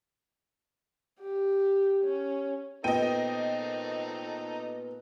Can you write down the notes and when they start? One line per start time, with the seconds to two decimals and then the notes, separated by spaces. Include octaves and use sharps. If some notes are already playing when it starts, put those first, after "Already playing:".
1.21 G4
2.04 C#4
2.84 A#2 B3 C4 D#4 A4 D#5 G5 D#7